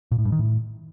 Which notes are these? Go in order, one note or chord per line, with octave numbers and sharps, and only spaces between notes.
A#2
A2
G2
D#3
A2